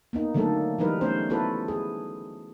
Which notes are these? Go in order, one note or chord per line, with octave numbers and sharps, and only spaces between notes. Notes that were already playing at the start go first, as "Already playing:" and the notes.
A#3 B3 D#4
D3 D#3 F#3 A3 A#3 A4
E3 F#3 G3 D#4 A#4 B4
G3 A3 B3 C#4 C5
B3 E4 F#4 A4 B4
G#4